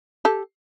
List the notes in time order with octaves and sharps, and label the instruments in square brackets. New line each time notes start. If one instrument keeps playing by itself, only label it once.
[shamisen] G4 A4